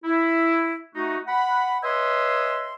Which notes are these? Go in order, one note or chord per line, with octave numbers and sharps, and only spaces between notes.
E4
A3 D#4 F#4
F#5 B5
B4 C#5 D#5 E5 G#5 C6